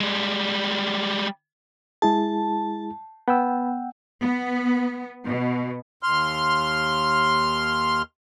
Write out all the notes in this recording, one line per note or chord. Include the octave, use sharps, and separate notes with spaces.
G3 G#3
G#3 E4 G#4 A5
B3 F#5 G5 E6
B3
B2
D#2 C6 F6